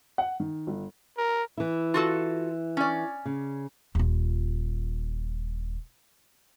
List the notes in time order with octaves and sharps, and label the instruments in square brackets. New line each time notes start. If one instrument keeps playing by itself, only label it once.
[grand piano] F#5
D#3
G1
[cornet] A#4
[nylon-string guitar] E3 E4
[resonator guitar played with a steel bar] F4 F#4 A4
C#4 D5
[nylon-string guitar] C#3
[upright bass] D#1 F4